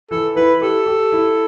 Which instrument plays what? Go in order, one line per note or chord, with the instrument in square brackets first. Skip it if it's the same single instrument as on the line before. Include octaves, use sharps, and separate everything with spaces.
[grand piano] E3 [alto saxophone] A4
[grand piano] E4 [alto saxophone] B4
[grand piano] G4 [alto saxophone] A4
[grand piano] G4
E4